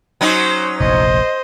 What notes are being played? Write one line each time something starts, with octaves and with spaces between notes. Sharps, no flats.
F#3 C#4 D#4 C5
F1 A#1 C5 D#5